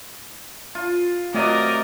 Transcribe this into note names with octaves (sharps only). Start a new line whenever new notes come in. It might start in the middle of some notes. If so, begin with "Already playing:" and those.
F4
C3 F#3 A3 A#4 D5 D#5